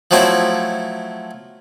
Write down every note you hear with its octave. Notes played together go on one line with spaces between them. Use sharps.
F3 F#3 A3 C4 E4